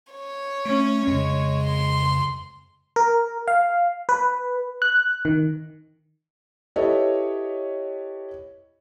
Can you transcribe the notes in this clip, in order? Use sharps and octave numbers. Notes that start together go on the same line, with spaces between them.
C#5
A3 C#4
F2 C#3 G#3
C6
A#4
F5
B4
F#6
D#3
E4 G4 A4 B4 C#5 D#5